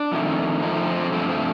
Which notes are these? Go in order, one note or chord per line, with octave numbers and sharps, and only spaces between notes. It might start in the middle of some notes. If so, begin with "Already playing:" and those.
Already playing: D4
F2 D#3 A3
F2 D3 F3 A3 D#4
C4
G2 F3 A3 C4
C4